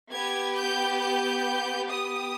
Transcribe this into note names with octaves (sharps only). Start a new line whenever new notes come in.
B3 G4 G#6
G6
G6
B3 G4 D#6